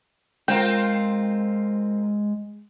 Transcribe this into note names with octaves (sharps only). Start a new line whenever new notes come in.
G#3 C4 F4 A#4 G5